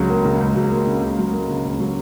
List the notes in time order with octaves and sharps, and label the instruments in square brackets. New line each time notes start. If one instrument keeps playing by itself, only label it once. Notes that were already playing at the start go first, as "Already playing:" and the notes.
Already playing: [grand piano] C#2 C#3 F#3
A#3
C#3
C#2
F#3
A#3
C#3
C#2
F#3
A#3
C#3
C#2
F#3